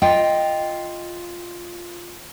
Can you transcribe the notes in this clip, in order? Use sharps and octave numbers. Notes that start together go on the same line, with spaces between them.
F4 D#5 G5